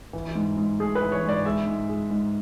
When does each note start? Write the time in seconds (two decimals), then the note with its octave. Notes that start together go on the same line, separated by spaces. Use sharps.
0.13 E3
0.35 G#2
0.57 G#2
0.79 A3 G#4
0.95 B4
1.02 E3
1.12 C#5
1.24 G#2 D5
1.45 G#3 E5
1.67 G#2
1.89 G#3
2.10 G#2